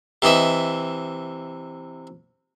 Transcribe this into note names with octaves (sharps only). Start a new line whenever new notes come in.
C3 E3 D#5 E5